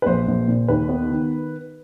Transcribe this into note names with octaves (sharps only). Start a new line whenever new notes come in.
B4
A#1 C5
A#1
A#2
D#2 B4
B3
D#3